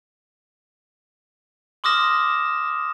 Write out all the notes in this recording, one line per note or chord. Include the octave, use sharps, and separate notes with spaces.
C6 D6 D#6 F6 A#6 E7